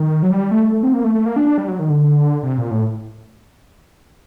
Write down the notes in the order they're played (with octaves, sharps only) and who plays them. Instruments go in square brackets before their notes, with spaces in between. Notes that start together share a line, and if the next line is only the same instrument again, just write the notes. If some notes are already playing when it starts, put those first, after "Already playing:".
Already playing: [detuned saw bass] D#3
F#3
G3
A3
A3
C4
A#3
A3
A3
A#3
D4
D4
G3
F#3
D#3
D3
C3
A#2
A2